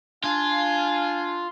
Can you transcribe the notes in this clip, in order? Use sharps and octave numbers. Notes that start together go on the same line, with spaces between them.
D4 F4 F5 G#5